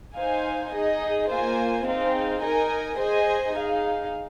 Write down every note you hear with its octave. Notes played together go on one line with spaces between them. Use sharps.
D#4 C5 F5 G#5
D#4 G#4 D#5
A#3 F4 C5 G#5
C4 D#4 G#4 F5
D#4 A#4 D#5 G#5
G#4 C5 D#5 G#5
D#4 G#4 F5